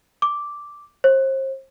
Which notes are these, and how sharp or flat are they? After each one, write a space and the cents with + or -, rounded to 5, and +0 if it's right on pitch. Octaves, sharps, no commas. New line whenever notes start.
D6 -5
C5 +35